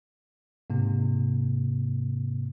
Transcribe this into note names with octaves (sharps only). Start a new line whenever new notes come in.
G#2 C3 A#3